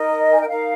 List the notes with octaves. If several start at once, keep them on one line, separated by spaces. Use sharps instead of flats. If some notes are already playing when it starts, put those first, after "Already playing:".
Already playing: D#4 A#4 D#5
G#5
G5
D#4 A#4 F5